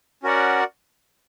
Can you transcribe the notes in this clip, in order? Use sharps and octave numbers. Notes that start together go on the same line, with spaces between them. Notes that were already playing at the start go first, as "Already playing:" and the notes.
C#4 F#4 A#4 D5 F#5